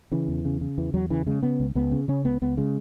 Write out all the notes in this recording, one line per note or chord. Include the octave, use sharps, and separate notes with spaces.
C#3 E3
E2
C#3
C#3
E2 E3
E2 F#3
C#3 E3
C#3 G#3
C#3 B3
C#2
C#2 B3
C#3
C#3 C#4
C#2 B3
C#2 B3
C#3 G#3